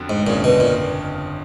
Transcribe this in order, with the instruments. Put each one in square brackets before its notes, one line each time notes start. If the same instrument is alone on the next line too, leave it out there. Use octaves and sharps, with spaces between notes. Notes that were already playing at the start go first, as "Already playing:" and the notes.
Already playing: [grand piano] F2 D3 F#3 B3
[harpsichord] G#2
[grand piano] G1 F2 C#3 [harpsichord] A#2
[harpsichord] B2
A#2